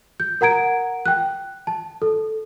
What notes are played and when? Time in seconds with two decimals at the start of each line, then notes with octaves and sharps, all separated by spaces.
0.20 G6
0.41 A#4 F#5 A#5 G#6 D7
1.06 G5 F#6
1.67 A5
2.02 A4